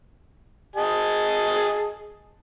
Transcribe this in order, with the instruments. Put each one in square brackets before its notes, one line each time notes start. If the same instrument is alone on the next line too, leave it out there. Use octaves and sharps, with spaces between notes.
[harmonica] G#4 D#5 A5